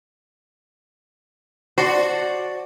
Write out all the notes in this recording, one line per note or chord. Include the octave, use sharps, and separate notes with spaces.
F#4 C5 D5 A5